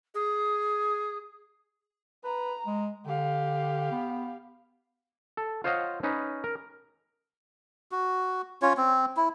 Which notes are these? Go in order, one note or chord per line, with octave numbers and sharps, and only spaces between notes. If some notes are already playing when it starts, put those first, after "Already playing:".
G#4
B4 A#5
G#3
D3 G4 F5
B3
A4
F4 C5 C#5 D#5 F5 F#5
C#4 D#4 B4
A#4
F#4
C#4 F4 C#5
C4
E4